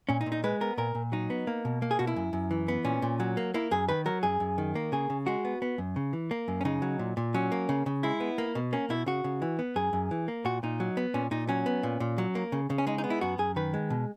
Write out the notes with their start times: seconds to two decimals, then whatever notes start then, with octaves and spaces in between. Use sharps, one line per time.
0.09 A#2 C#4
0.21 D#4
0.26 A#2
0.32 D#4
0.44 G#3 B4
0.61 B3 A#4
0.78 A#2 A#4
0.95 A#2
1.12 F#3 D#4
1.30 B3
1.47 A#3
1.65 B2
1.82 A#3
1.91 G#4
1.99 B2 F#4
2.07 E4
2.16 F#2
2.33 F#2
2.51 E3
2.68 B3
2.85 A#2 C#4
3.02 A#2
3.20 F#3
3.37 A#3
3.54 A#3 E4
3.71 F#2 G#4
3.89 D#3 B4
4.06 F#3 A#4
4.23 F#2 G#4
4.40 F#2
4.58 D#3
4.75 A#3
4.92 C#3 G#4
5.10 C#3
5.27 G#3 F#4
5.45 B3
5.62 B3
5.78 F#2
5.96 C#3
6.13 E3
6.31 A#3
6.48 F#2
6.61 C#4
6.65 C#3 D#4
6.82 F#3
6.99 A#2
7.17 A#2
7.34 F#3 C#4
7.52 A#3
7.69 C#3
7.86 C#3
8.03 G#3 E4
8.20 B3
8.38 A#3
8.55 B2
8.73 A#3 C#4
8.90 B2 E4
9.06 C#3 F#4
9.24 C#3
9.42 E3
9.59 B3
9.76 F#2 G#4
9.93 F#2
10.11 E3
10.28 A#3
10.45 A#2 F#4
10.63 A#2 D#4
10.80 F#3
10.97 B3
11.14 A#2 C#4
11.31 A#2 D#4
11.49 F#3 C#4
11.66 B3
11.83 A#2
12.00 A#2
12.18 F#3
12.35 A#3
12.52 C#3
12.70 C#3
12.78 C#4
12.87 G#3 D#4
12.98 D#4
13.04 B3
13.10 E4
13.21 F#2 F#4
13.38 F#2 G#4
13.56 D#3 B4
13.74 G#3
13.90 B2